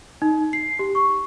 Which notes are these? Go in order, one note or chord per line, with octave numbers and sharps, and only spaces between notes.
D#4
C7
G4
C#6